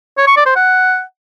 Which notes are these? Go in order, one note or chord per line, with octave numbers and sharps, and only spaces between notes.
C#5
C#6
D5
C5
F#5